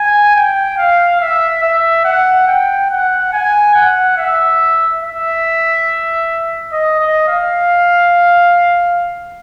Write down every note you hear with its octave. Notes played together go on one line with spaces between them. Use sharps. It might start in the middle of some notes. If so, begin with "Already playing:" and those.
Already playing: G#5
G5
F5
E5
E5
F#5
G5
F#5
G#5
F#5
E5
E5
D#5
D#5
F5